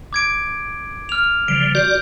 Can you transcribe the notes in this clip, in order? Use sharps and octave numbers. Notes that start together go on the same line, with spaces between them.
D6 G#6 D7
F6 F7
C#3 F3 G3 D7
F#4 D5 G6 G7